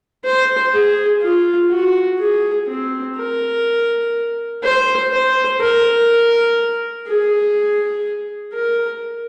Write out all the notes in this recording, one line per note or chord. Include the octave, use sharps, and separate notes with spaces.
C5
G#4
F4
F#4
G#4
C4
A#4
C5
C5
A#4
G#4
A#4